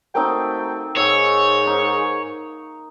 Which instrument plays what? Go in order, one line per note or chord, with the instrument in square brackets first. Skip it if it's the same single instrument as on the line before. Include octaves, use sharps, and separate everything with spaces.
[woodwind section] A3 F#4 G5 [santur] A#3 C4 D#4
[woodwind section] G#2 [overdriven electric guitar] C#5 [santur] C#6 E6
[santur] D#4